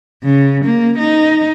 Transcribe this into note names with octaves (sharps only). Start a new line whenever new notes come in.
C#3
A#3
D#4